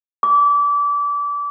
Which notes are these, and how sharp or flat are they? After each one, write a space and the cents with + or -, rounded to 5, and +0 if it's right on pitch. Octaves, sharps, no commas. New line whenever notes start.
D6 -25